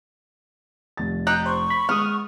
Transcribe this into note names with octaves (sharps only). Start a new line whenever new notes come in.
F1 A6
D#4 G4 F#6 G6
C5 C#6
B5
G#3 B3 D#6 F6